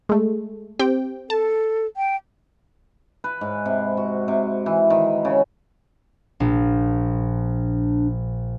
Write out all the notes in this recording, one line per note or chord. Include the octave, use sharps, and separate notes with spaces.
G#3 A3
C4 G4 G5
A4 A5
G5
B4
G#2
C3
F#4
C3
E3
D#3
C#3
A#1 D4